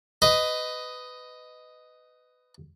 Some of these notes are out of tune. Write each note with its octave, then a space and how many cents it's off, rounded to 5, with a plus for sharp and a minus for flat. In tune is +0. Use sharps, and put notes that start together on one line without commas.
B4 +20 D#5 +0